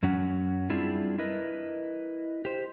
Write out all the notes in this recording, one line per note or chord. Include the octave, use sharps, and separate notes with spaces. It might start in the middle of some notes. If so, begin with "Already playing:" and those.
F#2 F#3 C#4 F#5
G3 C4 D4 E4 F4 G#4
E4 A#4 B4 D#5
G4 C5